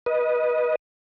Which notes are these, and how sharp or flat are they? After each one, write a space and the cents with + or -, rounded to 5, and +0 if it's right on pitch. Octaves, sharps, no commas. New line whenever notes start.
B4 -25 D#5 +0